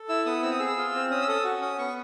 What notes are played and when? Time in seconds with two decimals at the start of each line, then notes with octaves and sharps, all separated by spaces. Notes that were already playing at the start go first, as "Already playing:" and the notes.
Already playing: A4
0.09 E4 E6
0.26 B3 D#6
0.42 C4 E6
0.51 D#6
0.59 G#4 E6
0.78 F4
0.95 C4
1.11 C#4 D#6
1.22 E6
1.28 A4 D#6
1.44 F#4
1.61 C#4 D#6
1.78 B3 C#6